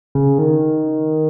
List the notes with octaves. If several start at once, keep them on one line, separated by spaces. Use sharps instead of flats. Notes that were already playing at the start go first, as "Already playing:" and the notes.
C#3
D#3